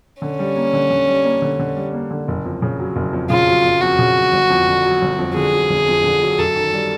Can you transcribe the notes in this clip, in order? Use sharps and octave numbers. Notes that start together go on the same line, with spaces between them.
D3 C#4
G3
A#3
D3
D3
G3
A#3
D3
D3
G3
A#3
D3
F#1
F2
C#3
F#3
F#1
F2
C#3 F4
F#3
F#1
F2 F#4
C#3
F#3
G1
F2
D3
F#3
G1
F2
D3 G#4
F#3
G1
F2
D3
F#3
F#2 A4
D#3
G3